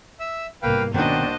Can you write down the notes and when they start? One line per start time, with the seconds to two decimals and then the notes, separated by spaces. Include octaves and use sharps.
0.20 E5 E6
0.63 C2 G#2 B2 A#3 B4 F5 G5
0.94 B2 D#3 A#3 C#4 D4 F#4 C5 D#5